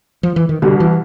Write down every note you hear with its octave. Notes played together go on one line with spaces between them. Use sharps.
F3
E3
D#3
C2 B2 D3 G3
E3